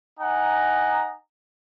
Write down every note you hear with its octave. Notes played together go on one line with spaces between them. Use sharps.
D#4 F#5 G#5 A#5